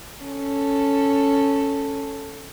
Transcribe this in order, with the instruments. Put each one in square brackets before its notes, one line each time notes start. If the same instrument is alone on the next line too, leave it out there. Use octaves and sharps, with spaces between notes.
[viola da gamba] C#4 A4